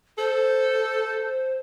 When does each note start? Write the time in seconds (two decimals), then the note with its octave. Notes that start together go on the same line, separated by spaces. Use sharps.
0.18 A4 C5